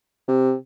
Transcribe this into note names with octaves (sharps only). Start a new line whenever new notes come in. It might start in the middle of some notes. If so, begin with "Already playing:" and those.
C3